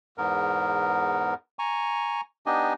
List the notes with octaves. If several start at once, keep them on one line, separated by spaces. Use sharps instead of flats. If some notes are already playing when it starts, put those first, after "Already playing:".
E2 G#2 B3 A#4
G#5 A#5 C#6
B3 D4 D#4 G4 D#5 G#5